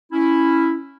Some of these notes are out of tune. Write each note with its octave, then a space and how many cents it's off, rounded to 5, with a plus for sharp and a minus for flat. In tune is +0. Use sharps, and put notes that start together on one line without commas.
C#4 +0 E4 +0